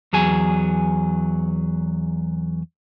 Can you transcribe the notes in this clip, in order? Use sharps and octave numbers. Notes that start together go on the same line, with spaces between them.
E2 F#3 G#4 G#5